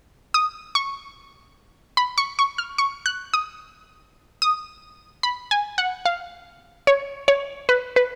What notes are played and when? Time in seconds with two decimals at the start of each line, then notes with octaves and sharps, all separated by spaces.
0.34 D#6
0.75 C#6
1.97 B5
2.18 C#6
2.39 C#6
2.58 F6
2.78 C#6
3.06 F#6
3.34 D#6
4.42 D#6
5.23 B5
5.51 G#5
5.78 F#5
6.05 F5
6.87 C#5
7.28 C#5
7.69 B4
7.96 B4